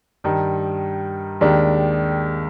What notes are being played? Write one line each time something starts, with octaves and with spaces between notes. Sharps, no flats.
G2 D#3 G3
D#2 D#3 G#3 D4 G4